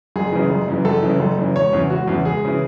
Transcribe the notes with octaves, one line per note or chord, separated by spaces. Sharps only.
F#1 G#4
F#2 C#3 E3
F#1
F#2 C#3 E3
F#1 A4
F#2 C#3 E3
F#1
F#2 C#3 E3
E1 C#5
E2 C#3 E3
E1 F#4
E2 C#3 E3
E1 G#4
C#3 E3